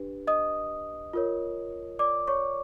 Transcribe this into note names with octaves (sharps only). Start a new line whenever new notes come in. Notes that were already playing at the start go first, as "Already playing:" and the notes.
Already playing: D4 G4 B4
D#5 D#6
F4 A#4 C#5
D5 D6
C#5 C#6